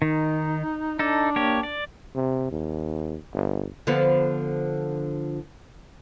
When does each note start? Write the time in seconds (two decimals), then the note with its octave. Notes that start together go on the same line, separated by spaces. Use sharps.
0.02 D#3 D#4
0.99 D4 D#4 A4
1.36 A#3 G4 C#5
1.63 D5
2.15 C3
2.52 D#2
3.34 G1
3.87 D3 F3 B3